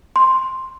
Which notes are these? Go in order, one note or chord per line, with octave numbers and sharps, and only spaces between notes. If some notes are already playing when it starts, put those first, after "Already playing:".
C6